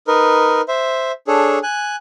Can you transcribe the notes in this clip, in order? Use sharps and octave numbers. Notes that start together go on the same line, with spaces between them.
D#4 A#4 B4
C5 E5
D4 G#4 A4 C#5
G#5 F#6